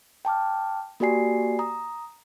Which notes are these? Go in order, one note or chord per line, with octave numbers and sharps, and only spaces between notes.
G5 A5 D6 F6
A#3 F#4 G4 D5 G#5 C7
A#5 D#6